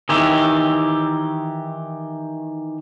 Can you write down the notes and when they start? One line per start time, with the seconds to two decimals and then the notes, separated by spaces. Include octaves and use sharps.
0.09 D#3 E3 G4